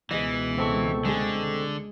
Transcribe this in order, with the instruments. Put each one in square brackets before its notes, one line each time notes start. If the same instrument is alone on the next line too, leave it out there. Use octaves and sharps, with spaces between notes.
[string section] C#2 B2 [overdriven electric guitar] E3 [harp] G#4 D#5
[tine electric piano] C4 A4 C#6
[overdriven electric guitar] D3 [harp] G#3 G#4